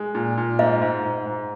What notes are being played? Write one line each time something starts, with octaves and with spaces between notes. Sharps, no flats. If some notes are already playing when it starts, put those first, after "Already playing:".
Already playing: G#3
A#2
A#2
G#2 D#5
G#2
G#2
G#2